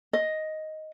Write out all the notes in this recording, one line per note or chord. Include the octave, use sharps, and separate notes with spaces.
D#5